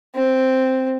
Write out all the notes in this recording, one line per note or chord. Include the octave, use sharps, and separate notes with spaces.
C4